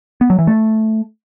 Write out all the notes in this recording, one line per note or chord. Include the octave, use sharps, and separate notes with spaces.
B3
F#3
E3
A3